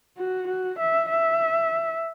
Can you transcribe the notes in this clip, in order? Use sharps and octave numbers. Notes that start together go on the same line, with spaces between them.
F#4
F#4
E5
E5